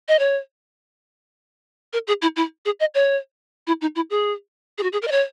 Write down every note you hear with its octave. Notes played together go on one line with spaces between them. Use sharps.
D#5
C#5
A#4
G#4
E4
E4
G#4
D#5
C#5
E4
D#4
E4
G#4
G#4
F#4
G#4
A#4
D#5
C#5